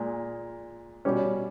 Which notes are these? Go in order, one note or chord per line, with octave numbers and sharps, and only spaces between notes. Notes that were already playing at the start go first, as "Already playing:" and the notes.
Already playing: A#2 G#3
B2 G3 C#4